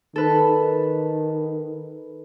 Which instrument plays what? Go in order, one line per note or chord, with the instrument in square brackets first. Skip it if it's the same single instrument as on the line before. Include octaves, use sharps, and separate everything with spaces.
[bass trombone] D#3 [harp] A4 B4